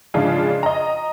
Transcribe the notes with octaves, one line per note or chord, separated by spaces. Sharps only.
G#2 C#3 F3 D4 F4 G#4
D#5 A#5